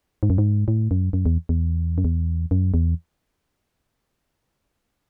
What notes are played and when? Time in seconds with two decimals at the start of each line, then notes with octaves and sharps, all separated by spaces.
0.23 G#2
0.30 F#2
0.38 G#2
0.68 A2
0.91 F#2
1.13 F#2
1.26 E2
1.49 E2
1.98 F#2
2.05 E2
2.51 F#2
2.74 E2